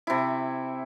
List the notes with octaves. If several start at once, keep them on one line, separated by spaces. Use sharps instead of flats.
C3 E4